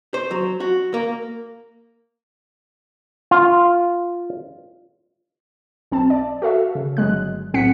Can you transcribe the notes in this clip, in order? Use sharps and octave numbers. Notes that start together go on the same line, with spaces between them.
C5
F#3
F#4
A#3
F4
B1 C4 A5
D5
F#4 A4 E5 F5
C#3
G1 F#3 G#3 F#6
B1 A2 C4 F#5 B6 C#7